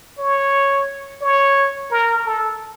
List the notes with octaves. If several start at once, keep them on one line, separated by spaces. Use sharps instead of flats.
C#5
C#5
A#4
A4